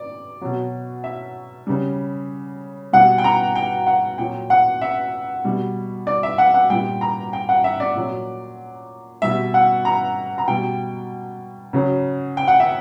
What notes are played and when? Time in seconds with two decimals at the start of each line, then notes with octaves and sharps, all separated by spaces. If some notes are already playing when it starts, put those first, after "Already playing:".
Already playing: D5
0.41 B2 F#3
1.04 E5
1.67 C#3 G3
2.93 B2 G3 F#5
3.18 G5
3.24 A#5
3.55 G5
3.87 F#5
4.18 A#2 F#3 G5
4.50 F#5
4.82 E5
5.44 B2 G3
6.07 D5
6.23 E5
6.38 F#5
6.54 F#5
6.70 A#2 G3 G5
7.01 A#5
7.33 G5
7.49 F#5
7.64 E5
7.80 D5
7.96 A#2 F#3
9.22 B2 G3 E5
9.54 F#5
9.85 A#5
10.38 A#5
10.48 B2 G3 G5
11.73 C#3 F#3
12.37 G5
12.48 F#5
12.60 E5